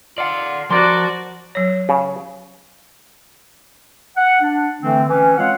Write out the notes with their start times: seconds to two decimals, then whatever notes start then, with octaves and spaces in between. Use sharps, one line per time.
0.18 F4 D5 F#5
0.70 F3 F#4 A#4 D5 C6 A#6
1.55 F#3 C#5
1.89 C#3
4.17 F#5
4.41 D4
4.81 D3 E3 A3 C4
5.08 E3 C#4
5.37 G#3 C4 F4 C#5 F5 F#5